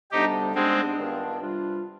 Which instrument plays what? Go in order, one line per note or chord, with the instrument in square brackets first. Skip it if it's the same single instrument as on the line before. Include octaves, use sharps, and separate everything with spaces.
[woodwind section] D2 C3 G3 B3 D4 [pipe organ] D#4 G4
[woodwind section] G#2 G3 B3 D4 [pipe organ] G#3 C4
[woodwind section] G2 D#3 B3 D4 F4
C3 G3 D4 F4